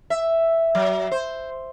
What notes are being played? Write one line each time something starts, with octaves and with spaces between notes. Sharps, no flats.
E5
F#3
C5